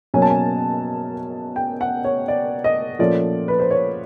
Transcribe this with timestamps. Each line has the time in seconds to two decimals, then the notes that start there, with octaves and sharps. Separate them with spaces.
0.14 B2 F#3 A#3 C#4 G#5
0.22 A5
0.30 G#5
1.56 G5
1.81 F#5
2.05 C#5
2.28 D5
2.64 D#5
2.99 A#2 F3 A3 C#4 D5
3.48 B4
3.60 C5
3.71 C#5